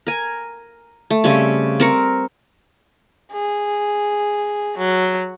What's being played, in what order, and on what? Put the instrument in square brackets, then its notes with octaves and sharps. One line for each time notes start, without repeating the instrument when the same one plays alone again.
[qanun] A#4 G#5
A3
C#3 G3 C4 C#4
C4 A#4 C#6
[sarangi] G#4
F#3